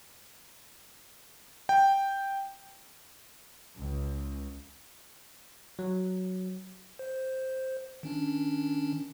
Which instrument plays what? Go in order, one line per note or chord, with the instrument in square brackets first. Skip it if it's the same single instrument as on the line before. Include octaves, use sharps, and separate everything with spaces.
[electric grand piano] G5
[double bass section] C#2
[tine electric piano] F#3
[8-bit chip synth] C5
D#3 C#4 D4